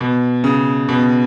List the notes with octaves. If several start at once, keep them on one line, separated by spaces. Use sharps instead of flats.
B2
C#3
B2